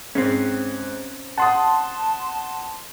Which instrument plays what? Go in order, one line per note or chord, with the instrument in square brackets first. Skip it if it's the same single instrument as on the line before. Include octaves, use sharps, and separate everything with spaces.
[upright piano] G#2 [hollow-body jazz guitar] C4 C#4
[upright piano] F#5 D#6 [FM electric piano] A5 C6